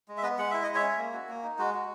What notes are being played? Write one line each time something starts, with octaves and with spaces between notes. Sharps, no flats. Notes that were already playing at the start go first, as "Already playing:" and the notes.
G#3
E5
B3 B4 D#5
G#3 F#5
E4 E5
D#5
G#3
C#5 E5
C#4
A#3
F#4
A#3
D#4
G#3 F#4
F#4